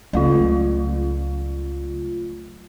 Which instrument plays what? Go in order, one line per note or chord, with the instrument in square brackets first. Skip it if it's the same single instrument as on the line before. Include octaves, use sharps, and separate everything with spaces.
[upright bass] C#2 [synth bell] F#3 A3 F4